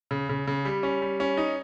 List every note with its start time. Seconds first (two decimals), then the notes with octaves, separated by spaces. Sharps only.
0.11 C#3
0.29 C#3
0.47 C#3
0.65 G3
0.83 C#4
1.02 G3
1.20 C#4
1.37 D#4